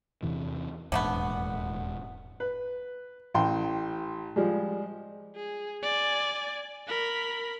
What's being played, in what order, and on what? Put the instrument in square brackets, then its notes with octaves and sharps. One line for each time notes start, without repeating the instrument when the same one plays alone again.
[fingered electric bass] E2 C3 E3
[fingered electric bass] D#1 E2 G#2 [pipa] D3 A3 B3
[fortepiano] B4
A1 G5 C6
F3 G3 G#3
[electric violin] G#4
D5 G#5
A#4 B5